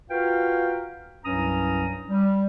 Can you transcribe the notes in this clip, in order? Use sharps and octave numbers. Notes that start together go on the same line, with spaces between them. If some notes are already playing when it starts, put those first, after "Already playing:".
F4 F#4 A#4 B4 F5 G5
C2 G2 F#3 C#4 A#5 D#6
G3